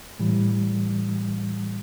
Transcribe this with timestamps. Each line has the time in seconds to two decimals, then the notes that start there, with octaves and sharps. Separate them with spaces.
0.19 A2 E3 G3